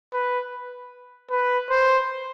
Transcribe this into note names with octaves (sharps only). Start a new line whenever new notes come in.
B4
B4
C5